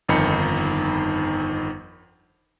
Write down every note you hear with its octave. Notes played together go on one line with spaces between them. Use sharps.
G1 F2 D#3 D#4 B5 C#7